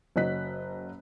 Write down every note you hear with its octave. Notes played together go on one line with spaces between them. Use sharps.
F#1 F#3 D#5 F#6 B6